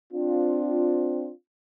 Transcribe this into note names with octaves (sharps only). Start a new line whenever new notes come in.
C4 D4 F4